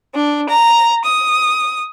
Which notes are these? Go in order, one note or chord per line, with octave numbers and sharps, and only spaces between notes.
D4
A#5
D#6